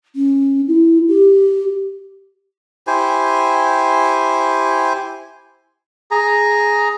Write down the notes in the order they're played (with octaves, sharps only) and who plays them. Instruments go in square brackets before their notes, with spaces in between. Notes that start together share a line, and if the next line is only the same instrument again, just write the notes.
[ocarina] C#4
E4
G4
[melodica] E4 G4 C5 G#5
G#4 A#5